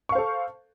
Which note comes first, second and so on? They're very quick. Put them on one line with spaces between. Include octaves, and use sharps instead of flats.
C#6 F5 C5 A4